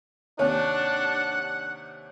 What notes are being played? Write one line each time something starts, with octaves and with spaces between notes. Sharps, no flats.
D#2 C3 C#4 D4 C#5 F#5